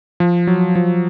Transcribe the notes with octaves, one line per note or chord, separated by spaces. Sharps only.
F3
F#3
F3